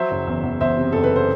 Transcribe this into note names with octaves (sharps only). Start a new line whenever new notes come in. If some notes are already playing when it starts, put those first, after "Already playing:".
Already playing: F#3 C5 E5
F#1
E2
E2
E2 C5 E5
C3
F#1 A4
B4
C5